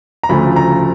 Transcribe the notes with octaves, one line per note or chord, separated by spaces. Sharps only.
A#5
D2 C#3 F3 A3 B5
A#5